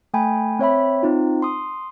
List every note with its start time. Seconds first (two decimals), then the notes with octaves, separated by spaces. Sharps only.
0.14 A3 G5 G#5 B5
0.59 C4 C#5 E5 B5
1.03 C4 D#4 F4
1.42 C6 D#6